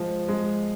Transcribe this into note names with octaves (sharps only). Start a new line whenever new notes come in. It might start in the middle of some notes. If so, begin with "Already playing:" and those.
Already playing: F3 G#3
G#3